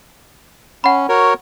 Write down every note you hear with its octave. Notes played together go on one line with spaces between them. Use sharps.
C#4 F#5 B5
F#4 A#4 C#5